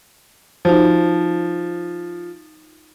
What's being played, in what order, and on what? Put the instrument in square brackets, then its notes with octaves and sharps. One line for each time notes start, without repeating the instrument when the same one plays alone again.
[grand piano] F3 [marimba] D#4 F#4 C5